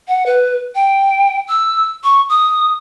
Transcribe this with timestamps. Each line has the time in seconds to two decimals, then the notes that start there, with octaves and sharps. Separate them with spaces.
0.08 F#5
0.26 B4
0.75 G5
1.49 E6
2.04 C#6
2.29 D#6